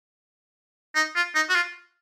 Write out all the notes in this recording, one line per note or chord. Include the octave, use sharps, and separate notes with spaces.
D#4
F4
D#4
F#4
F4